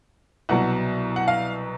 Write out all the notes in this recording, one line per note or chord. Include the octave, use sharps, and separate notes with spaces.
C2 B2 F#3 F#5
F#5
F5